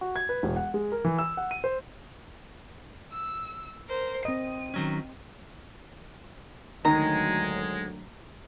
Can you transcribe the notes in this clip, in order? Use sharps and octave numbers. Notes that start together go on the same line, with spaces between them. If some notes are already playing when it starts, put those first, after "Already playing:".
F#4
G#6
B4
E1
F#5
G#3
A#4
E3
E6
F#5
D#7
C5
E6
A#4 C5
C4 D#5 D#7
D#3 F#3 C#4
D2 D#3 F#3 G#3 A#5